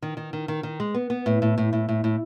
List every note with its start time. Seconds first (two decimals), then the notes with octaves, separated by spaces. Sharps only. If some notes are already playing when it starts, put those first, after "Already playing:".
0.02 D#3
0.17 D#3
0.33 D#3
0.48 D#3
0.63 D#3
0.80 G#3
0.94 B3
1.10 B3
1.26 A2
1.42 A2
1.58 A2
1.73 A2
1.89 A2
2.04 A2